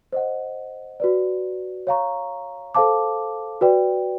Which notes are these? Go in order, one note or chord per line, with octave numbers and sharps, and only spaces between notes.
C5 D#5 F#5
F#4 B4 D5
C#5 F5 A#5 C#6
A4 C5 F5 A5 D6
F#4 B4 D5 G5